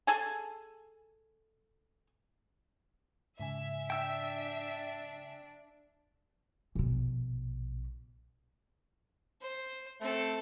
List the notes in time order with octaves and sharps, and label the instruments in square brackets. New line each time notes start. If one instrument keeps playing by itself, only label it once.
[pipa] G#4 A4 G#5
[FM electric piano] G#2 C#3 G#5 [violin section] E5
[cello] D4 [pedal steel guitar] G5 E6
[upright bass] A#1 B2
[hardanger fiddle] C5
[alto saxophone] A3 [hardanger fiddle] C4 A4